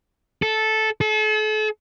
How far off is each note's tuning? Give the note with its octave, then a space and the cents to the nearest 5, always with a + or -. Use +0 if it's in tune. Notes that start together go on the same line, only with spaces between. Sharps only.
A4 -10
A4 -40